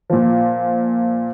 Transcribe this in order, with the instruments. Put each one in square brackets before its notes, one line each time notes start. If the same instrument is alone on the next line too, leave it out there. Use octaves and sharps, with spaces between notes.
[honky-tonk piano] A#2 F3